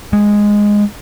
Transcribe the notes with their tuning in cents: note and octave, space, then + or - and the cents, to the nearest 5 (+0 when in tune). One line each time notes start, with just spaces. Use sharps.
G#3 -5